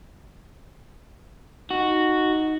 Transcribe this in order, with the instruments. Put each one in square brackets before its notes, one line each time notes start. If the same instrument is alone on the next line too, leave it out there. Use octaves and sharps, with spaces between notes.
[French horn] D#4 [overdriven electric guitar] F#4